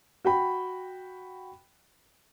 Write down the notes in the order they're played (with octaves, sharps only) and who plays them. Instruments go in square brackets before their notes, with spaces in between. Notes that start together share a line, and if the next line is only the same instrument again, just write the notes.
[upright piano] F#4 G5 B5